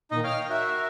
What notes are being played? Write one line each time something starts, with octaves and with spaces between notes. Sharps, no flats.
A#2 D#3 D#4 D#5
C#5 D#5 F5 G5 F6
F#4 A#4 E5